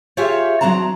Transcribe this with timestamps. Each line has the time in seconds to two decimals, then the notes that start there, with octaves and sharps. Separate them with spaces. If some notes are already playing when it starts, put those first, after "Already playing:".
0.17 F4 G4 G#4 C#5 E5 F5
0.61 E2 F#3 C4 D4 A5 A#5